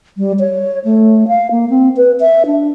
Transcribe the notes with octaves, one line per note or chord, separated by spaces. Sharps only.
G3
C#5
A3
F5
A#3
C4
B4
E5
D4